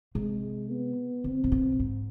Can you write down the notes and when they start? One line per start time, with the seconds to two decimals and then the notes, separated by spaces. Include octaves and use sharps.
0.15 C3 G#3
0.70 B3
1.24 D3 C4
1.44 C3
1.52 B2
1.79 G#2